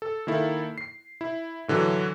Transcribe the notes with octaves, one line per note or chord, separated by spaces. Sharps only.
A4
D#3 A#3 E4 A4
C7
E4
A2 D3 E3 F#3